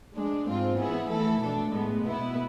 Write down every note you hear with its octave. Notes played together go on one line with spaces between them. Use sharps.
F3 G#3 D4
G#2 G#3 C4 F4
E3 B3 E4 G#4
E3 A3 E4 A4
B2 A3 D4 A4
A2 G#3 B3
B2 B3 E4